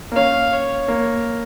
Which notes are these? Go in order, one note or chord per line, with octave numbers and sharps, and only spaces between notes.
A#3
C#4 F5
C#5
A#3